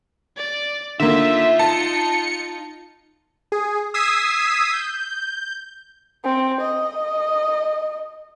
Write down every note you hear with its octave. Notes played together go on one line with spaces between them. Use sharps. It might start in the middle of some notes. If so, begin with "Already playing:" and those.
D5
D3 A#3 D#4 F4 E5
A5 C#7
G#4
D#6 E6 G#6 B6 C7 D#7
G6
C4
D#5